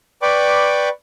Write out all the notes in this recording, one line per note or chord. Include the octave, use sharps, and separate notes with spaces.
B4 D5 G5 B5 C#6 D6